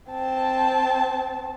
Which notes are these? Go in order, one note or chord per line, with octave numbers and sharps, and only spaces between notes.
C4 A5